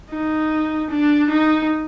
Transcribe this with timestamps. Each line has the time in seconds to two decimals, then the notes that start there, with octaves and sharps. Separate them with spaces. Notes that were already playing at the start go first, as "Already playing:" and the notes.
0.10 D#4
0.90 D4
1.29 D#4